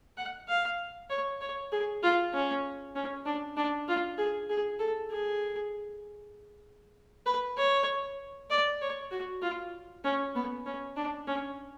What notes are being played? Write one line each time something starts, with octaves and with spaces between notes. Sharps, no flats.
F#5
F5
C#5
C#5
G#4
F4
C#4
C#4
D4
D4
F4
G#4
G#4
A4
G#4
B4
C#5
D5
C#5
F#4
F4
C#4
B3
C#4
D4
C#4